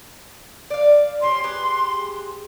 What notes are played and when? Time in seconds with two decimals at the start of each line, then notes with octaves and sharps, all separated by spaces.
0.70 D5 F5
1.22 C#4 E4 G4 C6
1.44 G4 G#4 B4